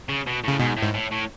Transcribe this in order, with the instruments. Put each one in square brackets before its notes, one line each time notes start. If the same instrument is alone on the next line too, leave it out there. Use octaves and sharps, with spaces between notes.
[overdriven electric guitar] C#3
B2
[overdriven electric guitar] A2 [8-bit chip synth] C#3
[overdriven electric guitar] G#2 [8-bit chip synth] B2
[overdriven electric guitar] A2
[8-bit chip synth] G#2
[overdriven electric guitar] A2
A2